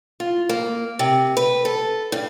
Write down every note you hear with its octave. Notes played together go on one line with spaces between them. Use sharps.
F4
A#3
C3
B4
A4
G2